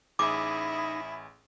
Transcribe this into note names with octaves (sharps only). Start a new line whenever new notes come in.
A1 D#4 E4 G#4 D6